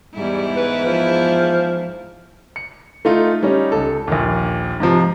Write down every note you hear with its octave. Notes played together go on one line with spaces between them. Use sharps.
E2 G#2 G3 E4
B4
F3
C#7
A3 D#4 F4
G3 C#4 D#4
C#2 A4
A#1 D#2
G#2 C3 F3